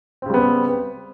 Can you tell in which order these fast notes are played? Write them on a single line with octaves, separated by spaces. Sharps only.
C4 C#3 G3 B3